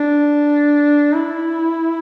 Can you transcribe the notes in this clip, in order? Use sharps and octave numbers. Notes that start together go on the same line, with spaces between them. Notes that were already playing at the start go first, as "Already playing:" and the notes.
Already playing: D4
E4